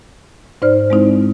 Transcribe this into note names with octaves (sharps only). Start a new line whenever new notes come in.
G#2 D#4 C5 D5 F6
G#3 C4 D#4 E4